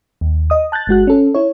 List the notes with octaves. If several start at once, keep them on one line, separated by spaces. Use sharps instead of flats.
D#2
D#5 D#6
A5 F#6 G6 A6
G1 G#3 F#4 F#6
C#4 A4
E4 C#5